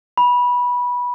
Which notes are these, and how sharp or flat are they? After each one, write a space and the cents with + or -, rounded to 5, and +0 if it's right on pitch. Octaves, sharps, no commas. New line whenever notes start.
B5 -15